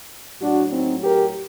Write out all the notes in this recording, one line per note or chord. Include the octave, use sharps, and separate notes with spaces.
A2 F#3 D4 F#4
C4 D#4
G4 A#4